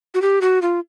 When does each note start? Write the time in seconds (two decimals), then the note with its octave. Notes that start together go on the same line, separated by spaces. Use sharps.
0.14 F#4
0.22 G4
0.41 F#4
0.62 F4